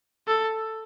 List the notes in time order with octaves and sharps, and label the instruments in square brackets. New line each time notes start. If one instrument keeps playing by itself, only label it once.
[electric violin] A4